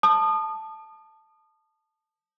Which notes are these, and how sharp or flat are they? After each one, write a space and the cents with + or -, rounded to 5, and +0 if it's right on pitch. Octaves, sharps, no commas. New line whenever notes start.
A5 +0 D#6 -30